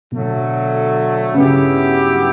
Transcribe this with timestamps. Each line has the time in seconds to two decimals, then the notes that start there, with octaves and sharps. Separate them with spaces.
0.12 B2 D3 F#3 A3
1.34 G2 C#3 F#3 B3 E4 G4